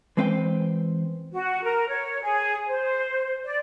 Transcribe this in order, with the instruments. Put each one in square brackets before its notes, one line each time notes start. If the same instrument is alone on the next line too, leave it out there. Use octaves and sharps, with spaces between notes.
[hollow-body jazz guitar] E3 G#3 C4 B4 F5 G5
[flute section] F#4
A#4
C#5
G#4
C5
D5